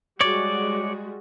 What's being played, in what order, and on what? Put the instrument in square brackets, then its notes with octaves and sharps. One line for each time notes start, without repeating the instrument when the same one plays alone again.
[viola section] G3 G#3 F#4 [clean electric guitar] C#5 D5